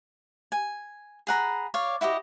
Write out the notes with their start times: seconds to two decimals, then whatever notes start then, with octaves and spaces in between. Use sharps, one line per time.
0.52 G#5
1.27 G#4 F#5 A#5 B5
1.74 C#5 D5 F5
2.01 E4 F#4 G4 D#5